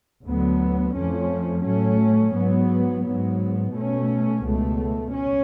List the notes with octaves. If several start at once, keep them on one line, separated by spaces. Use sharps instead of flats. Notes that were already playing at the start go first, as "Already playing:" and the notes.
D2 D3 F#3 B3
F2 F3 A3 C#4
A2 F#3 A3 C#4
G#2 F#3 B3
G#2 F#3 B3
B2 A3 C#4
C#2 B2 A3
C#4